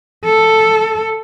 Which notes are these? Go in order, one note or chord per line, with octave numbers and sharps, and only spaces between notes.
A4